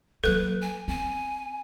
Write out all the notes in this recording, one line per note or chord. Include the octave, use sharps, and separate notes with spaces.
F#3 A#3 A4 B4 F#6
G#5
C4 G#5